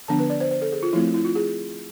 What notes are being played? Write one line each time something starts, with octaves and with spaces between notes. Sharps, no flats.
D3 F3 B3 D4 A5
B4
D5
C5
C5
A4
G#4
F4
F3 A3 C4 E4
E4
F4
G#4